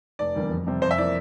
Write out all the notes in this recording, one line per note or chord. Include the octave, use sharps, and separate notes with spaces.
F1 D5
E2 D3 G3 A#3
F2
C3 G3 C4
F2 C5
E5
E3 A#3 D5